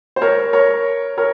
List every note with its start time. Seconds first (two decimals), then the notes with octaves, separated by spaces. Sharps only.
0.16 C5
0.22 A#4 C#5
0.53 A#4 C#5
1.17 A#4 C#5